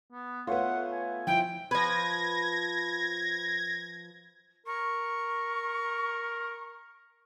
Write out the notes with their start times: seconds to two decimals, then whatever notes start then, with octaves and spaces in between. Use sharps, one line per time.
0.12 B3
0.47 A3 B3 F4 C#5 E5 F#5
0.92 G#5
1.27 F3 E4 G5
1.71 F3 B4 G#6 A#6
4.66 A#4 C#6